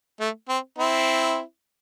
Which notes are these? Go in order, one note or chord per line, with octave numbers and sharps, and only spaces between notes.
A3
C4
C4 E4